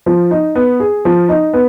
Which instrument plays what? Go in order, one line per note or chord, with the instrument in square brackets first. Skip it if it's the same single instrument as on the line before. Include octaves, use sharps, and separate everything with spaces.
[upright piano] F3
D#4
B3
G#4
F3
D#4
B3